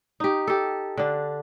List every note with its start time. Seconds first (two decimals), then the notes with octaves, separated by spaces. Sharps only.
0.20 D#4 G4
0.47 G4 A4
0.97 D3 D4